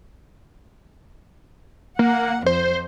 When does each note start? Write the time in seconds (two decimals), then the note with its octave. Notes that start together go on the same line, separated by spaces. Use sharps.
1.99 A#3 F#5
2.46 F2 C5